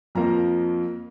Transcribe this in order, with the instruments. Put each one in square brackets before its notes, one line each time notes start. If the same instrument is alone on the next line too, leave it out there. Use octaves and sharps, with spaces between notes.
[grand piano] F2 F3 A#3 A#5